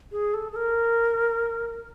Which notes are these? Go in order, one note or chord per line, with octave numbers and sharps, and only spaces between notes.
G#4
A4
A4
A#4